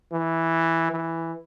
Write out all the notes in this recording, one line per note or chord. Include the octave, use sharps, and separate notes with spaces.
E3
E3